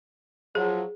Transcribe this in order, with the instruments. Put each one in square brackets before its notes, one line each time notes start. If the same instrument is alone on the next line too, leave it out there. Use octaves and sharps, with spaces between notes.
[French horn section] F3 F#3 [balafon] G#4